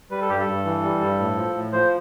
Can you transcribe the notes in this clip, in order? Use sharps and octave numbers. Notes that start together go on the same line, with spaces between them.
G3 B4
A4
G2 G4
A4
G2
E3
G3
G2
A2
F3
A2
F3 C5